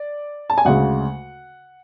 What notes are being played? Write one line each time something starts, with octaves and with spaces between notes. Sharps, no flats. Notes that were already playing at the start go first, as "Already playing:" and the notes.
Already playing: D5
A5
G#5
D2 C#3 G#3 F#5